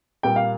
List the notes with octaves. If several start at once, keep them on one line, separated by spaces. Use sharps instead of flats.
A#2 G3 A#3 G5
F5